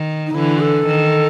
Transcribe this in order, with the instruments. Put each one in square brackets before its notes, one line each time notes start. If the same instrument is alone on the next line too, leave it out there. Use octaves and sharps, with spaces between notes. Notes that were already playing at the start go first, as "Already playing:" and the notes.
Already playing: [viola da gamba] D#3
[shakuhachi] D#4
[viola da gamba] D3 E3 [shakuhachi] E4
[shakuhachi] A4
[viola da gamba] D#3